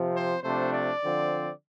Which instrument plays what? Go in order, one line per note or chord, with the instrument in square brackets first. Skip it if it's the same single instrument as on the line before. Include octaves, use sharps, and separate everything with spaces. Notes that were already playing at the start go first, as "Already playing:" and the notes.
Already playing: [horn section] C3 F3 C4
C5
C3 F3 A3 D4 C5
D5
D3 F3 C4